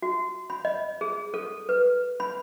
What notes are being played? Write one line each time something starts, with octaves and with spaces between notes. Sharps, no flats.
F#4
B5
D#5
G#4
A4
B4
B5